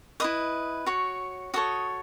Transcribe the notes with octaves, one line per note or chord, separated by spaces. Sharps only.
E4 B4 D#5 D#6
F#4 C#5
F#4 A4 C#5 D#6